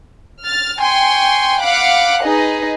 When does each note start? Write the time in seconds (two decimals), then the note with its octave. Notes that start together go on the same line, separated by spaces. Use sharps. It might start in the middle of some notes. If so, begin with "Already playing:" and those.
0.44 F6 A6
0.81 G5 G#5 C6 C#6
1.61 F5 F#5 B5 D6 F#6
2.24 D#4 G#4 B4 D#5